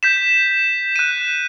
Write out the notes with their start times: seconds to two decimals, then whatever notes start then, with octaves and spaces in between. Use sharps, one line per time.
0.03 G6 B6 E7
0.96 F#6 D#7